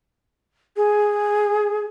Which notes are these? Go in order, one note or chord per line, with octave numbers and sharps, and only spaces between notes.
G#4